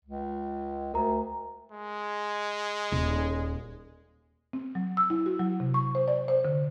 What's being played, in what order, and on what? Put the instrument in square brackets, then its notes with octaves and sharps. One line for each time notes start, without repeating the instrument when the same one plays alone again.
[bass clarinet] C#2
[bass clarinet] D2 [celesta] A#4 A#5
[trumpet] G#3
[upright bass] D#1
[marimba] C4
F#3
E6
E4
F#4
F#3
C3
C#6
C5
D5
C5
D3